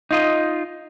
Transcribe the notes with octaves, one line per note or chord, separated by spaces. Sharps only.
D#4 F4 D#5